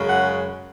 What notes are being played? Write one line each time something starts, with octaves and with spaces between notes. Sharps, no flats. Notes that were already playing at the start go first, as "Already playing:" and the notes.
Already playing: F#2 C#3 G#3
F#5